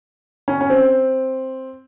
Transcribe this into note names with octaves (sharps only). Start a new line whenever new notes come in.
C#4
C#4
C4